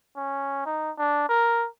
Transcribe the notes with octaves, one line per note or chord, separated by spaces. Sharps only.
C#4
D#4
D4
A#4